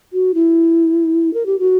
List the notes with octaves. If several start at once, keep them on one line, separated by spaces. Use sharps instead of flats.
F#4
E4
A#4
G4
F#4